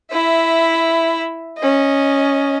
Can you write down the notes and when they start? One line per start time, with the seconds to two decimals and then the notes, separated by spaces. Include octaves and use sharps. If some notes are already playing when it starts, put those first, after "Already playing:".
0.11 E4 E5
1.58 C#4 D#5